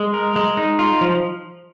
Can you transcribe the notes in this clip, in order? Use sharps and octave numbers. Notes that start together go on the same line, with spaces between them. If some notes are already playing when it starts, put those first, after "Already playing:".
Already playing: G#3
A#4
G#3
D#4
F4
F3